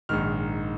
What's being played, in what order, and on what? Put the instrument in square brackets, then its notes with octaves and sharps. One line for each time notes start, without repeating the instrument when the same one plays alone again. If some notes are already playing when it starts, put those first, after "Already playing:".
[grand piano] A#1 G#2 D#3 F6